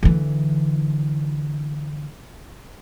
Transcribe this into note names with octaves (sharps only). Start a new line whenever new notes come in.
D3 E3